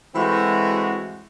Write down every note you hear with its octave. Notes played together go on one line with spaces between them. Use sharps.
E3 G#3 A3 C4 F#4